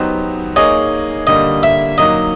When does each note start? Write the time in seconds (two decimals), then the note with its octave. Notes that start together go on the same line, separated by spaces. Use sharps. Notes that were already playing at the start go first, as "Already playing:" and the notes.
Already playing: F#3 B3 D#4 G4 C5
0.56 A#3 D#4 G#4 C#5 D#5
1.27 D3 G3 A#3 D#5
1.63 E5
1.98 F#3 A#3 D#4 F#4 D#5